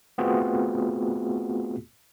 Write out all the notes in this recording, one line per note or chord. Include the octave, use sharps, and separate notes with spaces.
A3 B3 C4 F4 F#4 G#4